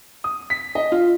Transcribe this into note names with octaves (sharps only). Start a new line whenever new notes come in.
D#6
B6
D#5
F4